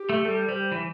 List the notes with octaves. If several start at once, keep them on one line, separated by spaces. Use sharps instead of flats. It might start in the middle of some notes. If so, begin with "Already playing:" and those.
Already playing: G4
A3
G3 A4
G3 C5
E3